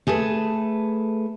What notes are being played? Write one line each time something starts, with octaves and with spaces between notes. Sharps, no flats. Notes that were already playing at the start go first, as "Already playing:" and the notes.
A3 G#4 A4 B4